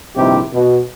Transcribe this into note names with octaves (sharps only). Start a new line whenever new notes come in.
A#1 G2 C3 D#3 E4 G4
B2